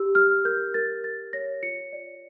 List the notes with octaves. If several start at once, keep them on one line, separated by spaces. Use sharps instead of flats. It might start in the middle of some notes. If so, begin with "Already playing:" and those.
Already playing: G4 E6
G4 F6
A#4 G6
A#4 A6
A#4 A6
C#5 A#6
F4 C#7
D5